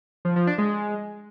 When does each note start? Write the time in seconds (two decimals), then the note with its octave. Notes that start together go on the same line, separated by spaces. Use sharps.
0.25 F3
0.36 F3
0.47 D4
0.58 G#3